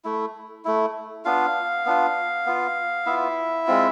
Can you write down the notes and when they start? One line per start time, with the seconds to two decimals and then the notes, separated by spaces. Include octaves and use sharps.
0.04 A3 E4
0.65 A3 E4
1.25 B3 D4 F4 F5
1.86 B3 D4 F4
2.46 B3 F4
3.06 B3 E4 F4 E5
3.67 G#3 C4 F4